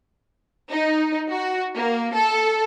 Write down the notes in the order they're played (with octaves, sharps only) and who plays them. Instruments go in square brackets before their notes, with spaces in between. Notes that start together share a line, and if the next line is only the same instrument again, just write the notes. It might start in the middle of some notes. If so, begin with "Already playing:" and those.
[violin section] D#4
F#4
A#3
A4